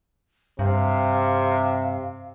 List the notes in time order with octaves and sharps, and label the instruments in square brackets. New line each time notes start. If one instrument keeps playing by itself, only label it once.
[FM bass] G2 [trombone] C3 [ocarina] F5